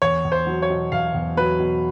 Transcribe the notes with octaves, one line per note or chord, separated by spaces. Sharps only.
E2 C#5
E2
C5
F#3
C#5
B2
E2 F5
E2
F#3 B4
B2